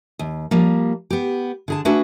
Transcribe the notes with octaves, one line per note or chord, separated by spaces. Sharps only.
D#2
F3 G3 A#3
B3 G4
D3 G#4 A5
A3 D4 F#4 G#4 B4